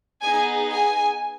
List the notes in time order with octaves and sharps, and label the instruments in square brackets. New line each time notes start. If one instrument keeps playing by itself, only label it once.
[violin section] B3 D#4 G#4 G#5
G#5